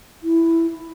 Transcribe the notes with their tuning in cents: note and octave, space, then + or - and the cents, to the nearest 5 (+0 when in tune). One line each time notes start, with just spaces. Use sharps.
E4 +5